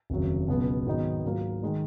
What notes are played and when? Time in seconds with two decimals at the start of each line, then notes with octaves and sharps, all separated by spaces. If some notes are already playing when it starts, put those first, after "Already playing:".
0.10 F1 D#2 C#3 F#3
0.48 C#2 B2 F#3 B3
0.86 G#2 D#3 F#3 B3 D#4
1.25 G#2 F#3 A#3 F4
1.63 D#3 G#3 D#4